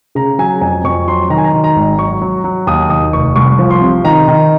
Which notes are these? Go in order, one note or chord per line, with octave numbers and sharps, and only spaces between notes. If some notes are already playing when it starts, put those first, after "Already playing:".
C#3 A#5
F#3 G#5
F2 G#5
F2 C#6
F#3 C6
D#3 A#5
G#5
A#5
D#3
A#5
G#1
F#3 C#6
F#3
F#3
D#2 D#6
D#3 D#6
F1 C#6
C2 C#6
F3
C6
C3
D#3 A#5
D#3